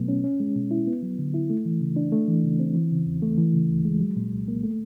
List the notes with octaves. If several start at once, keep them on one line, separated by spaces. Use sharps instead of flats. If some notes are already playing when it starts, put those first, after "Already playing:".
Already playing: B2 F#3 A3 B3
C#4
C#4
G#3
B2
E4
B3
F#3
D3
E4
A3
E3
C#3
D4
A3
E3
C#3
C4
E3
C#3
E2
A3
E3
C#3
D2
G#3
F#3
A#2
C2
A#3
A3